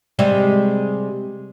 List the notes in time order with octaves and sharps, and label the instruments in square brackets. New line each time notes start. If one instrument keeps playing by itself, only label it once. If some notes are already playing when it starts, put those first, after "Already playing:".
[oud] C3 G3 G#3